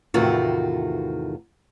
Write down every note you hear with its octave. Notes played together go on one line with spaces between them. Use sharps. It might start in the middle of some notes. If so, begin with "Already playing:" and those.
E2 A2 C3 D#3 F4 F#4